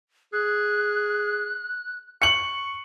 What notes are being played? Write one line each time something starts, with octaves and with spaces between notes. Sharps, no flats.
G#4 F#6
C#6 C#7 F#7